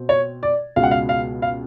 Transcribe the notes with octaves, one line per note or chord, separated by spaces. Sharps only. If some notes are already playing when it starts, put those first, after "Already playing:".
Already playing: B2 C4
C#5
D5
C#2 B2 G#3 F5
F#5
F5
F5
F5